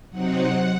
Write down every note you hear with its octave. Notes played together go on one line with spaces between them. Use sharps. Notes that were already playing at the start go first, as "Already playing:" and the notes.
C3 F#3 C4 D#4 F#5